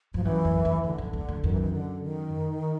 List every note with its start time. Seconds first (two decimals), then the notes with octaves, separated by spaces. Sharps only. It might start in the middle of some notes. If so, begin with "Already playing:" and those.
0.14 G2 F3
0.24 F#2 E3
0.45 F#2
0.65 E2
0.84 E2 D3
0.98 F2
1.13 E2
1.29 F2
1.43 F#2 D#3
1.53 E3
1.61 D#3
1.73 D3
2.03 D#3